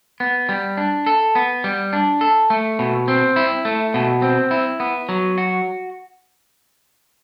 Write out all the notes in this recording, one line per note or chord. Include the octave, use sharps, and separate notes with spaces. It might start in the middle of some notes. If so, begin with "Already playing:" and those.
B3
G3
D4
A4
B3
G3
D4
A4
A3
B2
C4
E4
A3
B2
C4
E4
B3
F#3
F#4